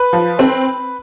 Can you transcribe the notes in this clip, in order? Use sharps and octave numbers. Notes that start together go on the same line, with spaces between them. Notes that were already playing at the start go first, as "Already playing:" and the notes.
Already playing: B4
F3
C4